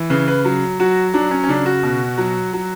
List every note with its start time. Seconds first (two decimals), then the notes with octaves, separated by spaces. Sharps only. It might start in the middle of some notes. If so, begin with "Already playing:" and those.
Already playing: E3
0.10 C#3 B4
0.28 B4
0.45 F#3
0.80 F#3 F#4
1.13 F#3 D4
1.31 C#4
1.44 C#4
1.49 C#3 D4
1.66 F#4
1.83 B2
2.17 F#3
2.53 F#3